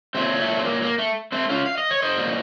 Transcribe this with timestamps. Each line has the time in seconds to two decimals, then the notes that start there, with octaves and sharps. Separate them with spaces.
0.14 A#2 F#3 A3 C4
0.40 A3
0.59 C4
0.65 A#3
0.82 A#3
0.98 A3
1.32 A3 C4
1.49 C#4 F4
1.66 F5
1.78 D#5
1.91 C#5
2.02 C5 D#5
2.17 A#2 F#3